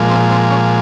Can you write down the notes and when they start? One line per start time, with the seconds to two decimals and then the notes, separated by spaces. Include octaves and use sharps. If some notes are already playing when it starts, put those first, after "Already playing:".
Already playing: A#2 F3 G#3
0.10 C4
0.31 C4
0.50 C#4